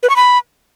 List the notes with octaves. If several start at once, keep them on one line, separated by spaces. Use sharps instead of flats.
B4
C#6
B5